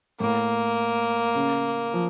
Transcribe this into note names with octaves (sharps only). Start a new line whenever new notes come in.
A2 A#3
C#3
F3